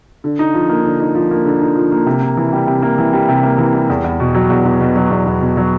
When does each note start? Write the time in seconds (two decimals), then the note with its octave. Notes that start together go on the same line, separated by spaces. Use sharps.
0.24 D3
0.39 D#4
0.54 F3
0.69 A#3
0.85 D3
1.00 D#4
1.15 F3
1.31 A#3
1.45 D3
1.61 D#4
1.75 F3
1.92 A#3
2.06 C3
2.22 A#3
2.37 E3
2.53 G3
2.67 C3
2.82 A#3
2.98 E3
3.13 G3
3.28 C3
3.43 A#3
3.58 E3
3.74 G3
3.89 E2
4.04 E2
4.20 B2
4.35 F#3
4.50 E2
4.65 E2
4.80 B2
4.96 F#3
5.11 E2
5.26 E2
5.41 B2
5.57 F#3